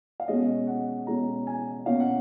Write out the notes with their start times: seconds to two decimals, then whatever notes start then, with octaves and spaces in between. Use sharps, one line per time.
0.20 F5
0.28 B2 G#3 C#4 D#5
0.67 F#5
1.07 B2 G#3 C#4 A#5
1.47 G#5
1.86 B2 A#3 C#4 F5
2.00 F#5